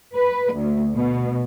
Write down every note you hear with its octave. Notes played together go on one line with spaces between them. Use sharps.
B4
D2
B2